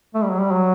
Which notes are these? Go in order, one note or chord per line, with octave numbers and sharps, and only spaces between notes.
A3
G3
F#3
G3
F#3